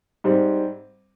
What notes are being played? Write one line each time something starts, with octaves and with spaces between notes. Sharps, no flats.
G#2 G3 C4